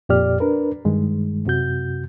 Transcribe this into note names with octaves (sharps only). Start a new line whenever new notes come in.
F2 A#2 G4 D5 F6
D4 A#4 B4
G2 D#3 G#3
F#2 C3 F#4 G6